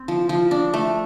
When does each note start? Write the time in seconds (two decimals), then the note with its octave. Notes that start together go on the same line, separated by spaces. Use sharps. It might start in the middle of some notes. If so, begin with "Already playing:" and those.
Already playing: C4
0.08 F3
0.29 F3
0.51 D4
0.74 A3